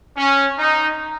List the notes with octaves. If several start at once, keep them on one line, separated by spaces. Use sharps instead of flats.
C#4
D#4